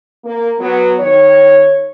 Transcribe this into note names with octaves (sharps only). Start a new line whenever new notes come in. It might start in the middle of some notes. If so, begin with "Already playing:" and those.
A#3
F#3 B3
D#3 C#5